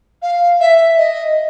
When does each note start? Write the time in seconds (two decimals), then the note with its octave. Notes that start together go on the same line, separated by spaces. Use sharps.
0.22 F5
0.60 E5
0.97 D#5